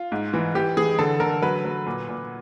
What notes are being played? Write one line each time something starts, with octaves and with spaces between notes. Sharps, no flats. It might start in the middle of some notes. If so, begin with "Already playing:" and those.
Already playing: F4
G#2
E3
E3 G4
E3 G#4
D3 A4
D3 A#4
F#3 B4
F#3
A#2
A#2